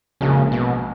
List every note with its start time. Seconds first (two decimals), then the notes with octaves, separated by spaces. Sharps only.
0.21 A#1 A#2 C#3 G#3 C#4 F#4
0.52 B2